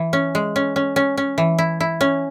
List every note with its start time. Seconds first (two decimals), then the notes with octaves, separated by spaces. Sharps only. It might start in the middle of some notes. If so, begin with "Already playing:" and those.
Already playing: E3
0.13 C#4
0.35 G#3
0.56 C#4
0.76 C#4
0.96 C#4
1.17 C#4
1.38 E3
1.58 E4
1.80 E4
2.01 C#4